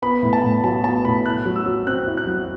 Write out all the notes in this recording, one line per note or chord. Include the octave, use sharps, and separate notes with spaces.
B3 B5
A2
A5
A2
F#3 A5
B3 A5
A2 B5
E4 F#6
F#3
E6
F#3
C4 F#6
E4
F#6
F#3